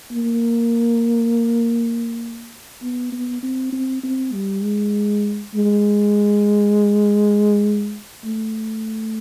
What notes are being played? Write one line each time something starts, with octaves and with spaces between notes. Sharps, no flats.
A#3
B3
B3
C4
C4
C4
G3
G#3
G#3
A3